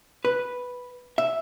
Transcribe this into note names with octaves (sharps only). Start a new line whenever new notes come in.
B4
E5